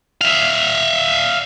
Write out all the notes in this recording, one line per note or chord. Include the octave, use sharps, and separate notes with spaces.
E5 F5